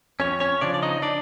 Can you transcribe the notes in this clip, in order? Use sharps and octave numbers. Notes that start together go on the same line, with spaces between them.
F2 C#4 C#5
C#4 C#5
C#3 F3 D4 D5
D5
D#4 D#5
D4 D5